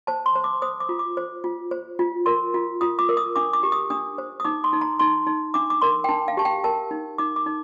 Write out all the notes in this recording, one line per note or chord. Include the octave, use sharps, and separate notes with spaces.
C5 A5
C6
C5
D6
C5 D#6
D6
F4
D6
C5
F4
C5
F4
A#4 C6
F4
F4 D#6
D6
A#4
D#6
D4 D6
D6
G4
D#6
D4 D#6
C5
D#6
D#4 D6
C6
D#4
A#5
D#4 C6
D#4
D4 D6
D6
A#4 C6
G5
D4 A5
F5
G4 A5
G5
A#4 A5
D#4
D#4 D6
D6
D#4